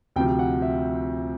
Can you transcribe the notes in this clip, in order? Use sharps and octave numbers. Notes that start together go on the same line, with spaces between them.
D2 C3 F3 G5
F#5
E5